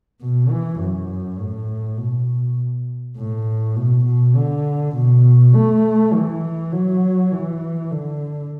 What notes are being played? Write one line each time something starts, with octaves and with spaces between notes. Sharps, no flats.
B2
E3
F#2
A2
B2
A2
B2
B2
D3
B2
A3
E3
F#3
E3
D3